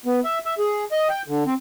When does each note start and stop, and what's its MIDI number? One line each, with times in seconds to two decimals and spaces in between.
0.06 0.20 59
0.25 0.39 76
0.46 0.54 76
0.58 0.85 68
0.92 1.08 75
1.09 1.22 79
1.28 1.44 50
1.46 1.54 60